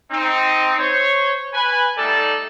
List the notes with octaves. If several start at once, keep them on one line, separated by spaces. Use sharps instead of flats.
C4 D#4
C5 C#5
B4 G#5
G3 A3 D#4 A4 D5